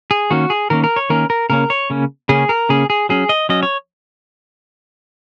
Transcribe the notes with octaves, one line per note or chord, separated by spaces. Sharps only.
G#4
D#3 A#3 C#4 F#4
G#4
D#3 A#3 C#4 A#4
A#4
C#5
D#3 A#3 C#4 A#4
A#4
C#3 A#3 C#4 A#4
C#5
C#3 A#3 C#4
C#3 A#3 C#4 G#4
A#4
C#3 A#3 C#4 G#4
G#4
F#3 C#4 G#4
D#5
F#3 C#4 D#5
C#5